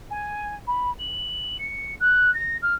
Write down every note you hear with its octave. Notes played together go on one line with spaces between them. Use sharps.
G#5
B5
F#7
C#7
F#6
A#6
F6